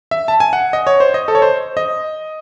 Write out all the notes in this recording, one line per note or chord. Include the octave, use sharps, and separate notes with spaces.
E5
A5
G#5
F#5
D#5
C#5
C5
D#5
A4
C#5
C5
D#5